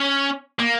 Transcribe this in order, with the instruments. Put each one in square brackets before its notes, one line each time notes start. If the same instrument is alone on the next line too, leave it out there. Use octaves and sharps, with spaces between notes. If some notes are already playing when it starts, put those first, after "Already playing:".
Already playing: [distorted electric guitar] C#4
A#3